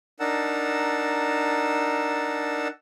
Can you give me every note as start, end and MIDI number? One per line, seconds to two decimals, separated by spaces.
0.20 2.68 62
0.20 2.68 63
0.20 2.68 70
0.20 2.68 78
0.20 2.68 81
0.20 2.68 88